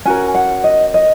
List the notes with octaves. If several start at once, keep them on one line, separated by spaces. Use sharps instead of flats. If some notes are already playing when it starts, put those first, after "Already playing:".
C#4 F#4 A#4 G#5
F#5
D#5
D#5